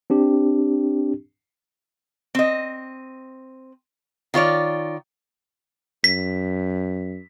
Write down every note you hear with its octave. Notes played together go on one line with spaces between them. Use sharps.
C4 D4 G4
C4 D#5
D#3 F4 C#5 D5
F#2 B6